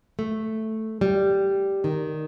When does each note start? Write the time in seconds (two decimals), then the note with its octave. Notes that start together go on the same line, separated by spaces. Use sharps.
0.19 A3
1.01 G3
1.84 D#3